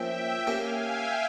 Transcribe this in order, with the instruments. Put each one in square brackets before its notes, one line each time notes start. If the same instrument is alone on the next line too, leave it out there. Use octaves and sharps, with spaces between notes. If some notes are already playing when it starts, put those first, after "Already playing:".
Already playing: [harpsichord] F3 A#3 C#4 [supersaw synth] E5 G5
[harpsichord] A#3 C#4 G4 [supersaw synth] F5 G#5
[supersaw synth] E5 G5